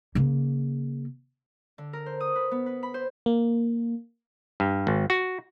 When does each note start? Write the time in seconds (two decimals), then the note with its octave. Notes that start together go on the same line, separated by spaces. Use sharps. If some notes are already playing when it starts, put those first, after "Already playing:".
0.15 C#3 A#3
1.78 D3
1.93 A#4
2.06 C5
2.20 D#6
2.36 B4
2.51 B3
2.66 B4
2.83 B5
2.94 C5
3.26 A#3
4.60 G2
4.87 G#1
5.10 F#4